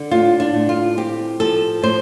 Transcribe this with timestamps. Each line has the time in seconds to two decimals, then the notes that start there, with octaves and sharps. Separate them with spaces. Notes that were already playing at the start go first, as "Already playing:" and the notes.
Already playing: D3
0.11 A2 F4
0.40 D4
0.54 A2
0.69 F4
0.97 C4 G4
1.40 F3 A4
1.82 A2 C5